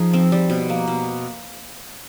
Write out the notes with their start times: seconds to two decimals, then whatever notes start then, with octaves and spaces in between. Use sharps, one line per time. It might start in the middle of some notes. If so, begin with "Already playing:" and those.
Already playing: F3 D#4 G#4
0.13 C4
0.32 G3
0.50 B2
0.70 A#3
0.88 B2